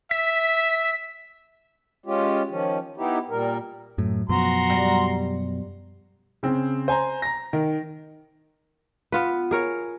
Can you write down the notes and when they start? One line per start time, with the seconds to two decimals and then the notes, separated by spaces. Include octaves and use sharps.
0.11 E5 B6
2.06 G#3 C#4 F4 G4
2.50 D#3 F3 C#4
2.97 B3 D#4 E4 G4
3.30 A#2 G3 A#4
3.98 F#2 A2
4.29 F#2 B2 F3 F#4 A#5 C6
4.70 G3
6.43 C#3 C4
6.88 C5 G#5 A#5
7.22 A#5 A#6
7.53 D#3
9.12 B3 F4 B4
9.51 G#4 A#4 C#5